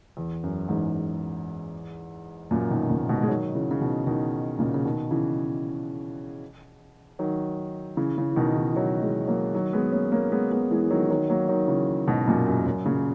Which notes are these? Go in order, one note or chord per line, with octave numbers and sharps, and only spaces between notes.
E2
F#2
E2 G#2
F#2 A#2
B2 D#3
A#2 C#3
G#2 B2
G#3
D#3 F#3
C#3 E3
C#3
B2 D#3
B2 D#3
A#2 C#3
C#3
B2 D#3
C#3 E3
D#3 F#3
C#3 E3
C#3 E3
E3
B2 D#3
C#3 E3
E3
D#3 F#3
E3 G#3
F#3 A#3
D#3 F#3
G#3 B3
A#3 C#4
A#3 C#4
G#3 B3
G#3 B3
E3 G#3
E3
D#3 F#3
E3
D#3 F#3
F#3 A#3
D#3 F#3
C#3 E3
G#2 B2
F#2 A#2
F#2
F#2
A#2 C#3